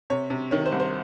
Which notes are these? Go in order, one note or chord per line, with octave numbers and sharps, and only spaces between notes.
C3 C#5
C3
D#3 C#5
C5
C2
C5